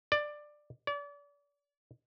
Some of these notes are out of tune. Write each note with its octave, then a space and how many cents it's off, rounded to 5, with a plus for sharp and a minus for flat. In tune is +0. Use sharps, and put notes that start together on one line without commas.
D5 +15
D5 -35